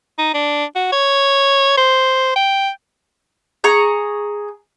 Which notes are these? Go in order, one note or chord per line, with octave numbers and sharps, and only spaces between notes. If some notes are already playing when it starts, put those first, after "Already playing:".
D#4
D4
F#4
C#5
C5
G5
G#4 A#5 C#6